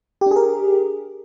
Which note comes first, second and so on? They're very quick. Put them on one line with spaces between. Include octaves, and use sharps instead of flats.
G4 D4 G#4 A#4